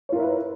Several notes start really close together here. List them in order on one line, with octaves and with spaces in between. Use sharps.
C#5 F4 A#4 E4 B4